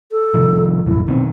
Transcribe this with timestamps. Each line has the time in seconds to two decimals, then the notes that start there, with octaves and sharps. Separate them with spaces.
0.12 A4
0.34 C3 D#3 F3
0.86 D#1 A1 F#2 E4
1.08 B2 D#3 C4